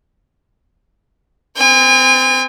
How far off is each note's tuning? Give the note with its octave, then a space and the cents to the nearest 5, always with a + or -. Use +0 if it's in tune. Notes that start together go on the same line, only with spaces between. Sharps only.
C4 -30 G#5 -45